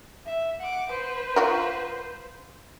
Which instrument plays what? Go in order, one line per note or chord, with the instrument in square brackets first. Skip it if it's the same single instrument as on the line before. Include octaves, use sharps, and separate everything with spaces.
[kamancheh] E5
F#5 D6
B4 C5
[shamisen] F4 F#4 A#4